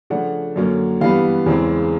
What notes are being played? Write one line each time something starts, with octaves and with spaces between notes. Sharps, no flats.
C#3 F3 A3 D4 F#5
F#2 D3 F#3 A#3 C#4
G2 E3 G3 B3 F5
E2 C#3 E3 G#3 C4